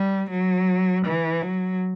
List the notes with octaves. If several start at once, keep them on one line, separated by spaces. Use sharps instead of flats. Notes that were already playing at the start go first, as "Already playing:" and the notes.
Already playing: G3
F#3
E3
F#3